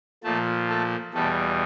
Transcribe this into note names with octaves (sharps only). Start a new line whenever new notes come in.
A#2 F3 A3 A4
A3 A4
E2 B2 G3 A3 A4